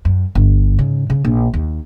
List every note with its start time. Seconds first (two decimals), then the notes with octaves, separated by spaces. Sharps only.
0.05 F#2
0.35 G1
0.78 G#2 C#3
1.10 C#3
1.25 A#1
1.54 D#2